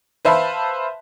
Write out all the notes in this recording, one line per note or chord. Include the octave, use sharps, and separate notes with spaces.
B4 C5 E5 F5 A5 B5